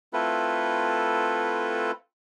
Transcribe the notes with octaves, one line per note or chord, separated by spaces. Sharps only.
A3 C4 E4 F4 A4 B4